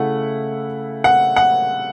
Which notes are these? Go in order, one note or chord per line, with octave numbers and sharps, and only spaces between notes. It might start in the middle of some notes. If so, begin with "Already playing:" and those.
Already playing: C#3 A3 E4 F#5
F#5
F#5